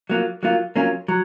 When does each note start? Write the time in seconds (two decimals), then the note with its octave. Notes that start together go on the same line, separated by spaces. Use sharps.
0.10 F#3 A#3 F4
0.43 F#3 A#3 F4
0.76 F#3 A#3 C#4 F4
1.08 F#3